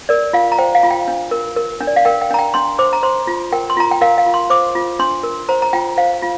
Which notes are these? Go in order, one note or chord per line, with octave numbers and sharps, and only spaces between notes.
A#4 D5
F4 F5
A#5
C5 G5
F5
F4
G5
D4
A#4
A#4
D4
D5
F5
A#4 G5
G5
D4 A#5
G5
D4 C6
C5 D6
A#5
C5 C6
F4
A#4 G5
C6
F4 A#5
G5
A#4 F5
F5
F4
C6
C5 D6
F4
D4 C6
A#4
C5 A#5
A#5
F4 G5
C5 F5
F4